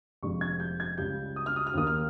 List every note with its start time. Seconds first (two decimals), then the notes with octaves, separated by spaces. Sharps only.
0.22 F1 F2 C3 D#3 G#3 C#6
0.41 G#6
0.60 G6
0.80 G#6
0.98 C#2 C#3 G3 G6
1.36 D#6
1.46 F6
1.56 D#6
1.67 F6
1.74 D#2 D#3 A#3 D#6
1.87 F6